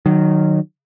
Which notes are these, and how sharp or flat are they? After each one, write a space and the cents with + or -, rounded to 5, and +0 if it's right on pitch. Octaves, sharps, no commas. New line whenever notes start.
D#3 -20 F#3 +0